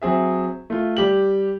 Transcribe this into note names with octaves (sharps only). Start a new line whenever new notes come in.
F#3 C4 G#4 E5
A3 F4
G3 G4 F#7